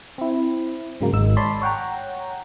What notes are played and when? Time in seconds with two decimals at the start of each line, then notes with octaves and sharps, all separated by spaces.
0.18 C4 E4
1.01 G#2 C#3 F#3 G#3 A#3
1.13 G#1 G#2 D#3 D#4 E6
1.37 C#5 D5 A5 B5 C6
1.62 C#5 F#5 G5 A#5